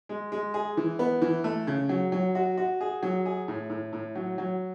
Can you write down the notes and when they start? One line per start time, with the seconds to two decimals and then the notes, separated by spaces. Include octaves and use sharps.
0.09 G#3
0.32 G#3
0.54 G#4
0.77 E3
0.99 B3
1.22 E3
1.44 A3
1.67 C#3
1.89 F#3
2.12 F#3
2.35 F#4
2.57 F#4
2.81 G#4
3.03 F#3
3.26 G#4
3.48 A2
3.70 A2
3.93 A2
4.16 F#3
4.38 F#3